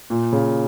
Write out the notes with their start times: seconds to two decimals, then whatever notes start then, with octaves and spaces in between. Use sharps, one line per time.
0.10 A#2
0.33 C#3